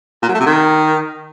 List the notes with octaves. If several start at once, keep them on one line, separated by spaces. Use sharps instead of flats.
A#2
F#3
A3
C3
D#3